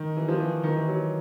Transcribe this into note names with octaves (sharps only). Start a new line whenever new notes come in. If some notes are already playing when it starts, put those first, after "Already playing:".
Already playing: D#3
E3
F3
E3
D#3
E3
F#3